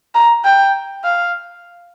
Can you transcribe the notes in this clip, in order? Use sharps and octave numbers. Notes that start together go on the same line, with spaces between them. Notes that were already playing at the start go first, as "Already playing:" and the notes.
A#5
G5
F5